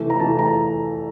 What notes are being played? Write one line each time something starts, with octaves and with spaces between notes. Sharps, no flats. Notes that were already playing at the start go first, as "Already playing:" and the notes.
Already playing: C3 E3 A3
A#5
C3 E3 A3 A5
A#5